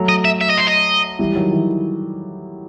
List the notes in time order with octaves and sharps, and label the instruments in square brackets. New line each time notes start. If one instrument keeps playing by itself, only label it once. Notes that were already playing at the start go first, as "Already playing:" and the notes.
Already playing: [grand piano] F#3 A3
[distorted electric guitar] D#5
E5
E5
D#5
C5
D#5
[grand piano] E3 G3
D#3 F#3
E3